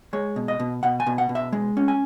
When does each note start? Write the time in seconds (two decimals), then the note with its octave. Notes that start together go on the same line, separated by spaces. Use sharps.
0.13 G#3 C#5
0.36 B2
0.48 D#5
0.60 B2
0.83 B2 F#5
1.00 G#5
1.07 B2
1.18 F#5
1.29 B2
1.35 E5
1.53 G#3
1.77 C#4
1.88 G#5